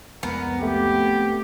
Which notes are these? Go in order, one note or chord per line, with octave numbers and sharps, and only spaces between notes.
C2 F2 G#3 B3 A#4
A3 C4 G4